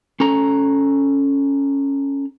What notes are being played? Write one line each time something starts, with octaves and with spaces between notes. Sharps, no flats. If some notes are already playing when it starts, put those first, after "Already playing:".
C#4 A4 A#5